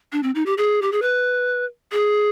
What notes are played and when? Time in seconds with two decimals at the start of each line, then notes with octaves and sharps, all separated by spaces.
0.12 D4
0.23 C4
0.35 D#4
0.46 G4
0.58 G#4
0.82 G4
0.92 G#4
1.02 B4
1.92 G#4